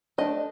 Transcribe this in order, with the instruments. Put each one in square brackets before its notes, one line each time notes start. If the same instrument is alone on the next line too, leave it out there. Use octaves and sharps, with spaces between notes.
[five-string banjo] A3 D4 D#5